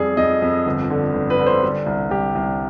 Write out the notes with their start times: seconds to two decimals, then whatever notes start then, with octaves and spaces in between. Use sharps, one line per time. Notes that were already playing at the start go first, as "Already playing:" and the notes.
Already playing: F2 G3 G#4
0.17 F2 D#5
0.42 F2
0.66 G1
0.90 D3
1.14 G1
1.30 B4
1.38 D3
1.47 C5
1.62 G3
1.86 C2
2.10 C2 G4
2.35 C2